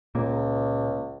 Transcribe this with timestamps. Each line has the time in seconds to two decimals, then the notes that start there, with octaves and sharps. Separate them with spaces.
0.15 C#2 A#2 A#3